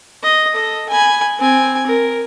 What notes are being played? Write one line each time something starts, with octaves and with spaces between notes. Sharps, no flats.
D#5
A4 D#5
G#5 B5
C4 G#5
A#4